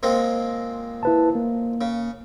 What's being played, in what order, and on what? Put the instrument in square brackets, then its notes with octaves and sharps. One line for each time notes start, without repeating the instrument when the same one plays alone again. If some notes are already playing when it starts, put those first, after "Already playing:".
[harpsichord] A#2 G#3 C4
[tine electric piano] E4 B4 A5
A#3
[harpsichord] C#3